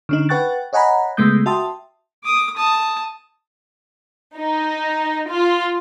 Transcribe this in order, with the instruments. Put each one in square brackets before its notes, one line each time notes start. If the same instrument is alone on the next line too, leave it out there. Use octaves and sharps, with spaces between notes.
[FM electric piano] D3 C#4 D#4
B4 F#5 G5 C#6 F#6 A6
C#5 D#5 F#5 G#5 A#5 B5
C#3 G#3 A3 B3 D#6 G6
F#4 E5 G5 A5 C6 D#6
[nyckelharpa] D6 D#6
A5 D#6
[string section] D#4
F4